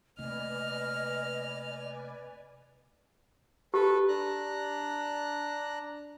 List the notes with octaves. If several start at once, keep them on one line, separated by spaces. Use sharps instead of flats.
C3 A3 A#3 B4 D5 D#5 G#5 F6
G4 A4 B4
D4 A#5 F#6